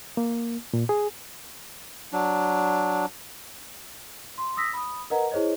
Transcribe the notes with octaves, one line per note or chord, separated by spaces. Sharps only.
A#3
A#2
G#4
F#3 D4
C6
D#6 E6 A#6 B6
B5 D#6
A#4 B4 D#5 F#5 A#5
E4 G#4 C5 C#5 D#5